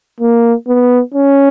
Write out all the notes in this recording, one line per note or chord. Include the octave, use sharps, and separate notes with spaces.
A#3
B3
C#4